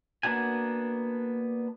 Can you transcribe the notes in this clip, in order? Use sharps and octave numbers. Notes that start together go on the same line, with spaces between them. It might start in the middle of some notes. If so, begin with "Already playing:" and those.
A#3 B3 D4 F#4 G#5